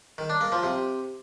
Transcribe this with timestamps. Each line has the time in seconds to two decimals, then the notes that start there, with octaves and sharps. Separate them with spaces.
0.18 D#3
0.30 D4
0.41 A#3
0.52 F3
0.63 C3